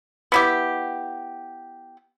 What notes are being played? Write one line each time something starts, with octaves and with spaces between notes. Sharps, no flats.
B3 E4 G4